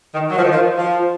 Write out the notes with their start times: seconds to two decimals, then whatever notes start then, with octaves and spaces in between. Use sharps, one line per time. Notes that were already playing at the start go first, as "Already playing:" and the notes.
0.13 D#3
0.30 F#3
0.37 F3
0.43 D#3
0.51 F3
0.77 F3